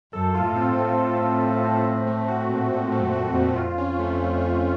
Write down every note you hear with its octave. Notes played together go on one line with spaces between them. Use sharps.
F#2 A4
F4
A2
C4
A2
C4
A4
F4
C4
C4
C4
A3
F#4
A#2
A2 C4
A3
F#2
F#4
F2
A#2
F2 F4
C#4
A3
A3
F4